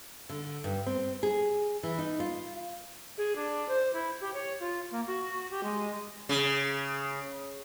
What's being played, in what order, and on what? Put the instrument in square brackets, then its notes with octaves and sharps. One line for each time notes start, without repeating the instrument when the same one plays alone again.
[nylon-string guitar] D3
G2
C4
G#4
E3
D#4
F4
[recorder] G#4
D4
C5
E4
G4
C#5
F4
A#3
F#4
G4
G#3
[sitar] C#3